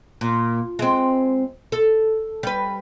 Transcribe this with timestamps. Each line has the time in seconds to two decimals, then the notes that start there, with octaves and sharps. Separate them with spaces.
0.21 A#2
0.79 G#3 C4
1.72 A4
2.43 G3 B4